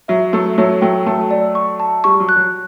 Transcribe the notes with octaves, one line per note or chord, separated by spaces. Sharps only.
F#3 E5
F#3 A3 E5
F#3 A3 C#5
F#3 A3 G5
F#3 A3 A5
D5
C#6
A5
G3 C#6
F#3
F#6
F#3